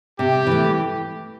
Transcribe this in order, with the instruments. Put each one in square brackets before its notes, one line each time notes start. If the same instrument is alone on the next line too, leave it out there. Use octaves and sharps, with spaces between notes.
[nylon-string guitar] C3 [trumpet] G4
[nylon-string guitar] E3 A3